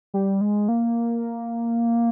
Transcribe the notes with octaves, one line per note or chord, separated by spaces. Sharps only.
G3
G#3
A#3